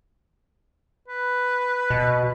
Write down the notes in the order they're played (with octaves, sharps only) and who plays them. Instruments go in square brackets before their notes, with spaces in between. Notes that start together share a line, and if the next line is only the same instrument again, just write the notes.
[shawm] B4
[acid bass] B2